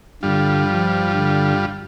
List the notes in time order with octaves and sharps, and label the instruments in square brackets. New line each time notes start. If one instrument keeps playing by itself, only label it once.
[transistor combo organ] G2 G3 F4 [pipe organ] D3
[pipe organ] F3
D3